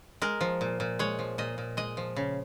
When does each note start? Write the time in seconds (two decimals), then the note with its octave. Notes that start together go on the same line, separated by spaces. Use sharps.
0.22 G#3 A#4
0.41 F3
0.61 A#2
0.80 A#2
0.99 G#3 C#5
1.19 F3
1.38 A#2 D#5
1.58 A#2
1.77 G#3 D#5
1.97 F3
2.16 C#3